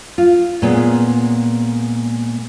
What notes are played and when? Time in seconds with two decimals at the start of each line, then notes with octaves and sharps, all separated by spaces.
0.18 F4
0.62 A#2 G#3 A#3 B3 C#4